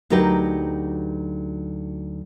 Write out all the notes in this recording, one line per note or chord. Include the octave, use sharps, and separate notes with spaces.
D2 F#3 D#4 G4 A#4 B4